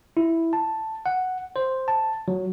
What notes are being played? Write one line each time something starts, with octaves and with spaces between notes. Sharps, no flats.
E4
A5
F#5
C5
A5
F#3